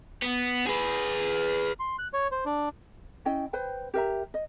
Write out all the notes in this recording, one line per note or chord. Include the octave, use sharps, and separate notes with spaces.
B3
G#4 B4
C6
F#6
C#5
C5
D4
C#4 E4 D#5 G5
B4 C5 G5
G4 A#4 E5 A#5
D#5